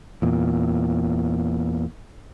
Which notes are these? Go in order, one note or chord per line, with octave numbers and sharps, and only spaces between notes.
E2 A#2